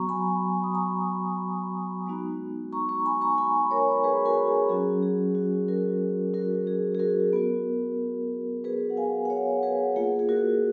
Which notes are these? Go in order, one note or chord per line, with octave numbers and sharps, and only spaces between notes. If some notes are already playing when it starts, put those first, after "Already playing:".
Already playing: F#3 B3 F#4 A#5 C#6
G#5 B5
D#6
A#5 C#6
G#3 B3 D#4 F#4
A#5 C#6
A#5 C#6
G#5 B5
A#5 C#6
G#5 B5
A#4 C#5
G#4 B4
F#4 A#4
G#4
F#3 C#4 F#4 G#4
G#4
F#4
F#4 A#4
F#4 A#4
G#4
G#4
F#4 A#4
B3 F#4
G#4 B4
F#5
F5 G#5
F#5
C#5 F5
G#4 B4
A#3 F4 G#4
G#4
F#4 A#4